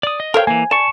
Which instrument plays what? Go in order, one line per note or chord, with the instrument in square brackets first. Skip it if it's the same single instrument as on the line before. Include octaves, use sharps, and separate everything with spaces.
[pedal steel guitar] D5 D#6
D#5
[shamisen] A4 C5 F5 [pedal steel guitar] A#4 C#5 G5
[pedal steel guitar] E3 A#3 [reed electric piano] G#5
[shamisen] D5 [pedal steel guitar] A5 C#6